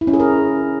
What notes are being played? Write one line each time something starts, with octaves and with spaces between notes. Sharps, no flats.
E4
C#4
G#4
A#4